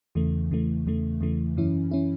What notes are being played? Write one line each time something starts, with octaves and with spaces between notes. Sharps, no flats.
E2 C#3 E3 A3
E2 C#3 E3 A3
E2 C#3 E3 A3
E2 C#3 E3 A3
F#2 E3 C#4 E4
E3 C#4 E4